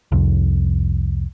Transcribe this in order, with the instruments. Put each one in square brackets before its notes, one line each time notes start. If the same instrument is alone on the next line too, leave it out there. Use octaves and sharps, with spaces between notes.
[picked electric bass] C2 F2